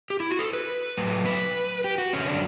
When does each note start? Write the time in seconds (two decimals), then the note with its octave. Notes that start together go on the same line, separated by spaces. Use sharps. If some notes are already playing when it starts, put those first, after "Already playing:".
0.10 G4
0.20 E4
0.30 F#4
0.39 A4
0.53 B4
0.97 A2 F#3 A3
1.26 B4
1.84 G4
1.98 F#4
2.13 F#2 D3 F#3 A3 C#4
2.28 D4